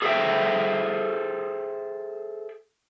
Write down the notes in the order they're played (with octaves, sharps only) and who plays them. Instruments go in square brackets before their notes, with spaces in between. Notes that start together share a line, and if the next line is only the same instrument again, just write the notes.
[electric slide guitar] G#4 A4 C5 D#5 E5 G5